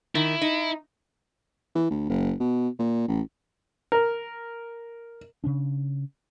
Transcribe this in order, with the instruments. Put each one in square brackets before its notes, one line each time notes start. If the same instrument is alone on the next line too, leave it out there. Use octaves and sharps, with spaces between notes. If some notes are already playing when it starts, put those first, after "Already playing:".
[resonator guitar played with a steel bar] D#3 [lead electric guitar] E4
[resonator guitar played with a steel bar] D#4
[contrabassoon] E3
D2
F#1
B2
A#2
A1
[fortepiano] A#4
[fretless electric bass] C#3 C#4 D4